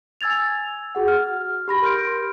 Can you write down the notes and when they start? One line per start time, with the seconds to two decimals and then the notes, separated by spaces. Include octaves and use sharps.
0.21 G#5 E6 G#6 A6 F7
0.95 F#4 G#4 F#5
1.08 F6
1.68 G4 B5 A#6
1.82 A#4 C6 F6 G6 D7